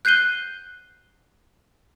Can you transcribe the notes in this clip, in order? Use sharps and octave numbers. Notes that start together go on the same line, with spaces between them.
F#6 G6 C7 D#7 G7